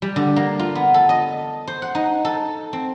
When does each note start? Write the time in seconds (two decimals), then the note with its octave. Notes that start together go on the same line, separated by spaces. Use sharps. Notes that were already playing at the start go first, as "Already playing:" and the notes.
0.02 G3
0.16 D3
0.36 A#3
0.59 F4
0.75 B3
0.94 A4
1.09 D#5
1.67 C5
1.82 F#5
1.95 D#4
2.25 A4
2.73 C4